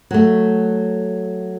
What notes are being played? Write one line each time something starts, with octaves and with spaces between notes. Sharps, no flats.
F#3 A3